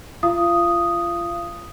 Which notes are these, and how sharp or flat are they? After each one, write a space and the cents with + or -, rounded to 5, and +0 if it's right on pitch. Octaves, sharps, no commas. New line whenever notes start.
F4 -25 F5 -30 D#6 +0